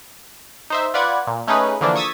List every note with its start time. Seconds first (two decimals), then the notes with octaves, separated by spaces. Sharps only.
0.70 D#4 C5 E5
0.94 F4 B4 D5 F#5 G#6
1.27 A#2
1.47 A3 C#4 D#4 G#4 B4
1.81 D3 E3 F3 A#3 D4
1.96 C#6 D#6 E6 G#6 A6 B6